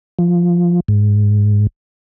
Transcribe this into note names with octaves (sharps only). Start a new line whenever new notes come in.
F3
G#2